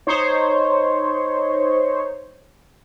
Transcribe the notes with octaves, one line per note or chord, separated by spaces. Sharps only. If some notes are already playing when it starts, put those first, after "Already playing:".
D#4 C5 C#5